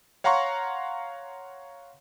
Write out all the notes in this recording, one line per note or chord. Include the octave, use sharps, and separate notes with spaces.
C#5 F5 F#5 A#5 C6 C#6